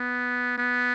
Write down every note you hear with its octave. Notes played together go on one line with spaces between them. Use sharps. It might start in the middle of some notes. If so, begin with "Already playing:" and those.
Already playing: B3
B3